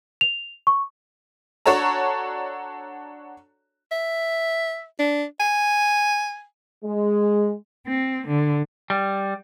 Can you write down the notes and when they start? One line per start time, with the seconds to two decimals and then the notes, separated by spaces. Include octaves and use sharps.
0.21 F7
0.67 C#6
1.66 D4 F#4 A4 C#5 A5 A#5
3.92 E5
4.99 D4
5.40 G#5
6.84 G#3
7.85 C4
8.26 D3
8.90 G3